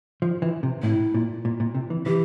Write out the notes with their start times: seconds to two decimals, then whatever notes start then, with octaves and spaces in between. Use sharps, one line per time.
0.22 F3
0.42 E3
0.63 C3
0.83 A2 E4
1.14 A#2
1.45 A#2
1.60 A#2
1.75 C3
1.90 E3
2.06 E3 G4